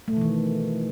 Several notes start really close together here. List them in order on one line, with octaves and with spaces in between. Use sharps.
A3 B2 E3 D#3